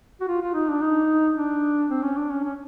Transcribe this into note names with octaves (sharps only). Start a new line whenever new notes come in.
F#4
F4
F4
D#4
D4
D#4
D4
C4
C#4
D4
C#4
C#4